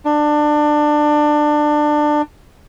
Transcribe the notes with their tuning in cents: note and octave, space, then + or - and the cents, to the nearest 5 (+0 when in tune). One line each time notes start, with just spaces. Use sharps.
D4 +20